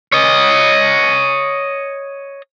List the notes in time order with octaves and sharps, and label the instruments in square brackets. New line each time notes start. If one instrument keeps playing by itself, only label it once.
[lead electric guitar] C#5 D#5